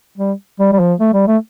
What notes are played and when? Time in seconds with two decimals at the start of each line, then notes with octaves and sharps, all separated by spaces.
0.18 G3
0.59 G3
0.73 G3
0.80 F3
1.00 A3
1.13 G3
1.27 A3